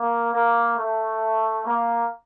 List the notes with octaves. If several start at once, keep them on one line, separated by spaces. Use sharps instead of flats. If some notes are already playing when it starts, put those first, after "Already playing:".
Already playing: A#3
A#3
A3
A#3